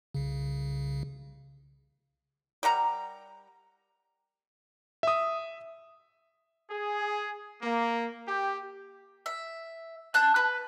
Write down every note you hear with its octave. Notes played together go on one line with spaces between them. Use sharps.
C2 C#3
G3 A#4 F#5 A#5
E5 D#6
G#4
A#3
G4
E5
A5 F#6 G6
B4